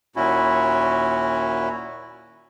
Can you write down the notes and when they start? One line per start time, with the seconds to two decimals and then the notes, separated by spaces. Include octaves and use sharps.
0.16 D#2 A#2 C#4 E4 F#4